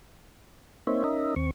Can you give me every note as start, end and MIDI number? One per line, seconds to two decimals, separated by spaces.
0.87 1.04 58
0.87 1.04 60
0.87 1.04 63
0.87 1.04 72
0.87 1.04 73
0.87 1.04 76
1.04 1.35 61
1.04 1.35 63
1.04 1.35 70
1.04 1.35 75
1.04 1.35 76
1.36 1.51 39
1.36 1.51 60
1.36 1.51 85